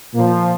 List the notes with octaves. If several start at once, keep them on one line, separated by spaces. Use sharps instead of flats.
A#2 F3 A#3